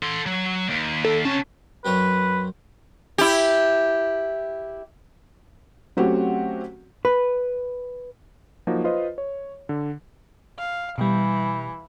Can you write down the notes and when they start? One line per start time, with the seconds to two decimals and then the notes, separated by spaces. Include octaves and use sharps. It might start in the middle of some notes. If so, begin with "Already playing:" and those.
0.03 A4 C6
0.26 F#3
0.70 D#2
1.05 A4
1.25 C3 C#4 A5
1.85 F#2 C4 B4 C#5
3.18 E4 G4
5.97 F#3 A3 C4 C#4 F#4 G4
7.05 B4
8.67 F3 F#3 A#3 D#4 F#4
8.84 F4 B4 C5 D#5
9.18 C#5
9.69 D3
10.58 F5
10.98 B2 E3 G3